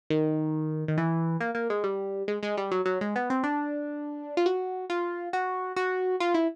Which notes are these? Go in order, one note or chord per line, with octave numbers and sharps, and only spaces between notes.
D#3
D#3
E3
A#3
A#3
G#3
G3
G#3
G#3
G3
F#3
F#3
G#3
B3
C4
D4
F4
F#4
F4
F#4
F#4
F4
E4